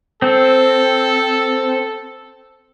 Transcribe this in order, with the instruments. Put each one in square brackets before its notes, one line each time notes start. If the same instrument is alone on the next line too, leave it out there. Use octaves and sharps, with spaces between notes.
[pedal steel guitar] C4 [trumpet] A4